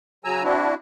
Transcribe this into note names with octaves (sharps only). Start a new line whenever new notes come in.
C#3 F#3 G#5 A#5 E6
C4 D4 E4 F#4